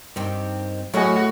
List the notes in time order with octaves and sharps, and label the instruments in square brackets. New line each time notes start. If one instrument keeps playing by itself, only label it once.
[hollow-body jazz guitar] G2 [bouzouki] D#3 C4 G4
[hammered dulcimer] A2 [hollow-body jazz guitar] F#3 G#4 [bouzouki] C#4 C#5 D#5 [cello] F#4